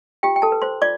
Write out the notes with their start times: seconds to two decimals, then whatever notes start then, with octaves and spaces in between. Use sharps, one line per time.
0.23 F4 G4 G5
0.36 G5
0.42 A4 A5
0.52 B4
0.62 C5 C6
0.82 F4 D5 D6